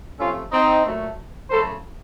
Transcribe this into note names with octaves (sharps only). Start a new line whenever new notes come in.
C3 F3 A3 C#4 F4
C4 D#4
A#2 F#3 A3
F#2 C#3 A3 A4 C5